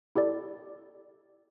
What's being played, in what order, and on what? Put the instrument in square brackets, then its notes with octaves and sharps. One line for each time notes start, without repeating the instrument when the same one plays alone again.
[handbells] E4 G4 A4 D5